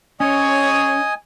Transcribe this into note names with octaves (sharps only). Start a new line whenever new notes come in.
C4 C#4 G#4 C#5 D#5 G#5 D#6